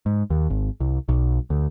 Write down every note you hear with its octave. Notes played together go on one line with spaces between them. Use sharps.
G#2
D#2
G#1
C2
B1
D2